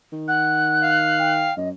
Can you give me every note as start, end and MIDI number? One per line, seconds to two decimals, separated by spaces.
0.13 1.51 51
0.28 0.90 78
0.28 1.34 90
0.82 1.52 77
1.19 1.55 79
1.57 1.72 42
1.57 1.69 75